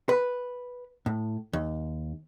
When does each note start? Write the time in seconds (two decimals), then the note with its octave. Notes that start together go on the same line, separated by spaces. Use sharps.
0.09 B4
1.06 A2
1.53 D#2